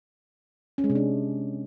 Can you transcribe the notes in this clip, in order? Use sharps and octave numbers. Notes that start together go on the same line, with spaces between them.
C#4
G#3
C3
D4